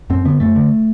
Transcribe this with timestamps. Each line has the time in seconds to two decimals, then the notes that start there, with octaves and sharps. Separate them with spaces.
0.10 F#2 C4
0.25 D3 B3
0.40 F#2 A3
0.56 D3